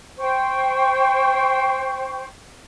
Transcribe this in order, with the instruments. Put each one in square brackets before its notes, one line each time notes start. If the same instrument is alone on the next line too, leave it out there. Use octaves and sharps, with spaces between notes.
[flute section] C5 G5 C#6